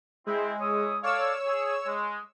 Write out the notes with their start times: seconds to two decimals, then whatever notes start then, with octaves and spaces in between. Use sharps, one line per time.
0.26 G#3 C4 E4
0.60 E4 C#5 D#6
1.03 A4 C#5 D5 F5 E6
1.46 G#4
1.86 G#3